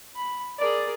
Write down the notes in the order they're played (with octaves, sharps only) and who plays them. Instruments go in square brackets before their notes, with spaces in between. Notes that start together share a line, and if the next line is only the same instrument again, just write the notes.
[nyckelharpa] B5
[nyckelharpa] G#4 A#4 [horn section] D5